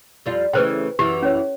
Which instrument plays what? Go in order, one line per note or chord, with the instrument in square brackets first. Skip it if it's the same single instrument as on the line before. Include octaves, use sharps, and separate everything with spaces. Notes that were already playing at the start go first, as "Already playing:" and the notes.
[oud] F2 G3 F4
[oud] C#3 E3 A3 [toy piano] B4 C5 G5
[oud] F#2 E3 [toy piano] G4
[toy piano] C#4 C#5